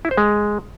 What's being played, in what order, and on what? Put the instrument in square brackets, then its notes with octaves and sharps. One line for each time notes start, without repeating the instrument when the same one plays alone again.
[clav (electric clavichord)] E4
C5
G#3